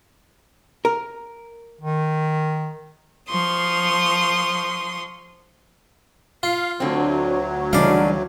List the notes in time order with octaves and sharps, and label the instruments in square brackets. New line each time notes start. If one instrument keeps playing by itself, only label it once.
[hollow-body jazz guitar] A#4
[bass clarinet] D#3
[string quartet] F3 C6 C#6 D#6
[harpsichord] F4 [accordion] F5
[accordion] D2 F#3 [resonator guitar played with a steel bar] D3 C4
[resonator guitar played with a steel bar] C#3 D4 D#4 [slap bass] E3 G3 [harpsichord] D5 F5